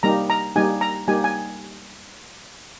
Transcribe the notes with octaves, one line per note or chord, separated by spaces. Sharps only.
G3 A#3 D#4 G4 A#5
A#5
G3 A#3 D#4 G4 G#5
A#5
G3 A#3 D#4 G4 G#5
G#5